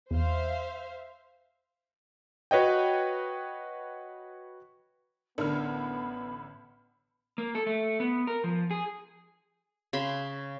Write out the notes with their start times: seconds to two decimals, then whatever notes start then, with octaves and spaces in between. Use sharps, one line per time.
0.11 E2 C5 E5 F5
2.51 F#4 B4 C#5 D#5 G5
5.38 A1 D3 B3 D4 A#4 B5 F6
7.38 A#3
7.55 A4
7.67 A3
8.00 B3
8.27 A#4
8.44 F3
8.71 G#4
9.93 C#3 B5 C6